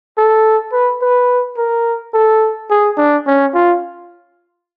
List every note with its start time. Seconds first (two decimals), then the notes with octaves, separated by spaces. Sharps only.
0.17 A4
0.72 B4
1.02 B4
1.57 A#4
2.14 A4
2.70 G#4
2.97 D4
3.26 C#4
3.54 F4